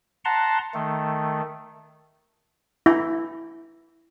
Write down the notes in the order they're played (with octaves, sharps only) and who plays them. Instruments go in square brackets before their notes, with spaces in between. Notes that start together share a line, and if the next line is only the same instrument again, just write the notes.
[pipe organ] F#5 A5 A#5 C6
D#3 A3
[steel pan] E4